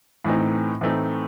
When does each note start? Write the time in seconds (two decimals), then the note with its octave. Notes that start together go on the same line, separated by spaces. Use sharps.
0.25 A2 E3 A3 C4 D#4
0.81 A2 E3 A3 C4 D#4